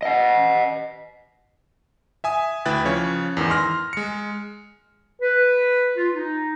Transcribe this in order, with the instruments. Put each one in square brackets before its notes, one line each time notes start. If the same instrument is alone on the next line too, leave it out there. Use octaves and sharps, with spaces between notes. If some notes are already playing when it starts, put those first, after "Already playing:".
[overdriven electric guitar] D#5 F#5
[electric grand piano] E5 G#5 D#6
D2 E4 B4 G5 F#6 A6
C#3 F3 C#4 C#5
E2 G#2 D#3 E3
C6 F6 A#6
G#3 C#7
[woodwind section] B4
F4
D#4